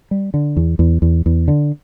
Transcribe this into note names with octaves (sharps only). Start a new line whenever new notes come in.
G3
D3
E2
E2
E2
E2
D3